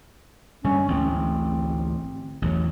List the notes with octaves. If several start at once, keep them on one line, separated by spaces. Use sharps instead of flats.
G2 D3 G#3 C#4
A1 D2 G#2 C4
A1 E2 F#3